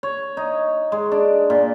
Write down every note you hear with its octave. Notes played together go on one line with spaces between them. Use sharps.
C#5
D#4
G#3
D4
A#2